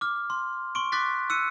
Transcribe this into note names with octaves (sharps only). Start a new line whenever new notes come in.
D6 F6
C6
C6 C#6 D7
C6 D6 F#6 A6 B6
E6 F#6 C#7 D#7